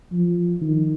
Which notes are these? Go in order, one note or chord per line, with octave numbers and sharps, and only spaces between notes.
F3
D#3